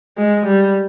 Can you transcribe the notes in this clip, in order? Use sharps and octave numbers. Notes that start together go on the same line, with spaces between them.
G#3
G3